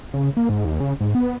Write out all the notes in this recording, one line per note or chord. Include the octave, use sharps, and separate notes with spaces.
C#3
A#3
G#2
D#2
C#3
G#2
B3